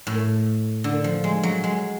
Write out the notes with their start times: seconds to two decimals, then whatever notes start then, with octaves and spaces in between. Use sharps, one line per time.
0.07 A2
0.84 D3
1.04 F3
1.24 G#3
1.43 F#3
1.64 G#3